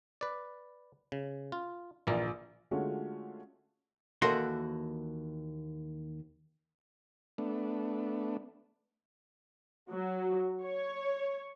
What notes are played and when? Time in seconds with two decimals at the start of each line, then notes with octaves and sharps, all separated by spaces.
0.21 B4 D5
1.12 C#3
1.52 F4
2.07 A#1 E3 A#3 F4 D5
2.71 D3 G#3 A3 C#4 F4 F#4
4.22 D#2 E3 F#4 A4 A#4 C6
7.38 A3 B3 D4
9.90 F#3
10.63 C#5